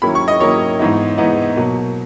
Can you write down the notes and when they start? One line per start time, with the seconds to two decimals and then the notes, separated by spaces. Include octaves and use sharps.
0.02 D#3 F#3 A#3 C#4 E4 B5
0.15 C#6
0.28 D#5
0.40 D#3 F#3 A#3 C#4 E4 C#5
0.79 G#2 E3 B3 D#4
1.18 G#2 E3 B3 D#4
1.57 B2 F#3 A#3